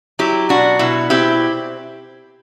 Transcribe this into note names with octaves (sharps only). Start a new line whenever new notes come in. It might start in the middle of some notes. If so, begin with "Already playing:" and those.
F#3 E4 G4
B2 D4 F#4
B2 E4
C4 E4 G4